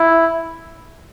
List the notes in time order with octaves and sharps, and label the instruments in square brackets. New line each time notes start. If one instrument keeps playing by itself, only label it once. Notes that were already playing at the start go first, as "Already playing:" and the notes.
Already playing: [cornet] E4